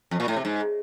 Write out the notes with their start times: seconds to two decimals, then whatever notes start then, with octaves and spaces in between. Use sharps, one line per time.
0.11 F2
0.20 A#2
0.28 A2
0.36 C3
0.45 G#2